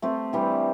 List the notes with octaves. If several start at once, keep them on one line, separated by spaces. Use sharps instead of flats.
A3 C4 G4 C5
E3 G3 D4 G4